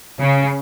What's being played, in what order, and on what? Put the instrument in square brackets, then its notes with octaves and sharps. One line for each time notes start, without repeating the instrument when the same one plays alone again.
[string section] C#3